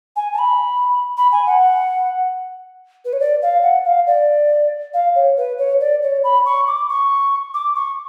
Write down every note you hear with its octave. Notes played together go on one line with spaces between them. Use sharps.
G#5
A5
B5
B5
G#5
F#5
B4
C#5
D5
F5
F#5
F5
D5
F5
C#5
B4
C#5
D5
C#5
B5
C#6
D6
C#6
D6
C#6